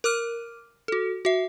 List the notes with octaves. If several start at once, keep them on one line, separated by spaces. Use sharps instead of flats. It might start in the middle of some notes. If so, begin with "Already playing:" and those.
A#4 D6 F6 D#7
F#4 A4
F#4 E5